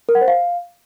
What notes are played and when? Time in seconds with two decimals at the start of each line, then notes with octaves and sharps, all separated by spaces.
0.09 A#4
0.15 F#5
0.21 C5
0.28 F5